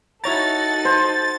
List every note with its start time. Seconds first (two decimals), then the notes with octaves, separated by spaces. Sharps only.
0.24 D#4 E4 F#4 A4 C#5 A#5 A6
0.85 C5